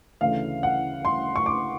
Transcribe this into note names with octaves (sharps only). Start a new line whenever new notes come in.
D2 C#3 E3 A3 F5
F#5
C6
C#6
D6